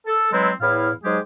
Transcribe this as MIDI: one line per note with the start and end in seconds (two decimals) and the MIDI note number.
0.07 0.32 69
0.32 0.50 52
0.32 0.50 54
0.32 0.50 56
0.32 0.50 60
0.32 0.50 64
0.61 0.90 40
0.61 0.90 45
0.61 0.90 64
0.61 0.90 77
1.03 1.18 44
1.03 1.18 54
1.03 1.18 56
1.03 1.18 67
1.03 1.18 68